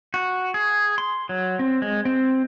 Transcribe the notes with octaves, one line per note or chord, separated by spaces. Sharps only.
F#4
G#4
C6
F#3
C4
G#3
C4